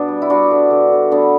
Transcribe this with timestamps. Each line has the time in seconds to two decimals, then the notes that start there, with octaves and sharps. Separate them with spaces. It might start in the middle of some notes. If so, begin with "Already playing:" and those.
Already playing: B2 B3 D4
0.08 G3
0.22 E4
0.30 G3 D4 F#4
0.51 D3
0.71 D3
0.92 D3
1.11 A2 B3 D4